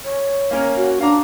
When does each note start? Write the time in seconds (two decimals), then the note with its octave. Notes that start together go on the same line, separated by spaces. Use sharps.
0.04 C#5
0.51 A#3 C#4 A#4
0.76 F#4
1.01 D4 F5 A#5